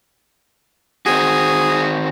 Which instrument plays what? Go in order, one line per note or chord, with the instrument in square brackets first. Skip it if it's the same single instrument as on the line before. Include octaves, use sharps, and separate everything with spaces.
[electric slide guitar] D#3 C4 F#4 [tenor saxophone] G#4